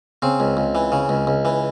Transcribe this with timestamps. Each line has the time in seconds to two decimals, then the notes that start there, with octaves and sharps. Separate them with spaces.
0.22 C#3 C4
0.40 C#2
0.57 C#2
0.75 E3
0.92 C#3
1.09 C#2
1.27 C#2
1.45 E3